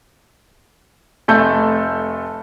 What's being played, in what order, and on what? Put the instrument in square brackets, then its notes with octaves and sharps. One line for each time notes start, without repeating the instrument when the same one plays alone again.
[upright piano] F1 A3 A4 G6